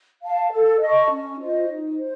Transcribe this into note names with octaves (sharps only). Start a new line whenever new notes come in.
F5 A5
A4
D#5 A5 C#6
C#4
F4 C5 D#5
D#4
C5